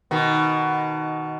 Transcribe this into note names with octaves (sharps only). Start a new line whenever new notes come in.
B2 D#3